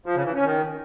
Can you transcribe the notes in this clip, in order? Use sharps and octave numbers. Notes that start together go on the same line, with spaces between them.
F3
C#3
E3
C#4
D#3